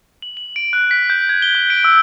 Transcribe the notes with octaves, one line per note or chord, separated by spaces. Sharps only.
F#7
F#7
D7
F#6
B6
G6
G#6
G7
G6
D7
E6